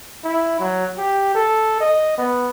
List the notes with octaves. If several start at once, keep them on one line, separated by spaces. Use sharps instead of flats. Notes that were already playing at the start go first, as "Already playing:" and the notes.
E4
F#3
G4
A4
D#5
B3